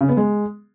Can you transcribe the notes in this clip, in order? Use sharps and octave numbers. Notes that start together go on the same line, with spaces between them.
C#3
B3
G#3